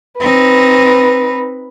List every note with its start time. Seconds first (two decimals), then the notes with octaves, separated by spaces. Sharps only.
0.20 C4 D#4 B4